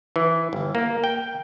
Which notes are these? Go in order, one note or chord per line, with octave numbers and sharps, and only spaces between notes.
E3
G1
A#3
G5